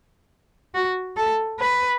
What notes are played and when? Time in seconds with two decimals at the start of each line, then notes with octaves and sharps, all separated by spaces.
0.74 F#4
1.17 A4
1.60 B4